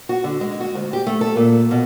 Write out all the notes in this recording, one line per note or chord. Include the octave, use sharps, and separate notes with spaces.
F#4
D3
G#3
F#4
D2
G4
A3
A4
A#2
B2